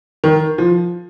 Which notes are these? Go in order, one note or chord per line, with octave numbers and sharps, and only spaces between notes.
D#3
F3